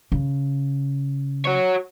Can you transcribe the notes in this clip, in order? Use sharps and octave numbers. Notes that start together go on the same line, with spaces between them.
C#3
F#4 C#5